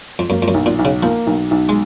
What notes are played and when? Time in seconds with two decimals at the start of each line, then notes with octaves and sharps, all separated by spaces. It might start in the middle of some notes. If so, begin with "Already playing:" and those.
0.19 F2
0.30 F#2 A#3
0.42 F2
0.48 F#2
0.54 B1
0.66 A#2
0.79 B1
0.85 C#3
1.03 F3 A#3
1.27 B1
1.51 B1
1.69 G#3